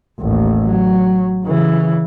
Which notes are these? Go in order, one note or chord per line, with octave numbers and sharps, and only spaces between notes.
A1 D#2
F#3
C#3 E3